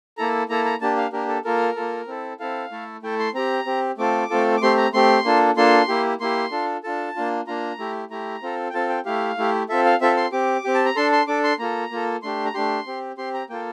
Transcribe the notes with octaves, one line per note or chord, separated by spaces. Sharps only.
A#3 E4 A4 A#5
A#3 E4 A4 A#5
A#5
A#3 D4 G4 A5
F5
A#3 D4 G4 A#4
A4
A#3 F4 A4 A#4
A#3 F4 A4
C4 E4 A4
C4 E4 A4 F5
A3 E4 A4
A3 E4 A4 G5
C6
C4 G4 A#5
C4 G4
A3 C4 F4 A4 D6
A3 C4 F4 A4
D6
A3 C4 G4 C6
A#5
A3 C4 G4 C6
A#3 D4 F4 A4
A#3 D4 F4 A4 C6
A#3 E4 G4
A#3 E4 G4 C6
D4 F4 A4
D4 F4 A4 A5
A#3 D4 F4
A#3 D4 F4 A#5
A3 E4 G4
A3 E4 G4 A#5
C4 F4 A4
G5
C4 F4 A4 A5
G5
A3 E4 G4 F5
A3 E4 G4
C4 F4 A4 E5
F5
C4 F4 A4 E5
C6
C4 G4 D6
C4 G4
A5
A#5
D4 A4 C6
C6
D4 A4 D6
C6
A#3 F4 A4 A#5
A#3 F4 A4
A3 D4 G4 C6
A#5
A3 D4 G4 C6
C4 G4
C4 G4 C6
A#5
A#3 F4 A4 G5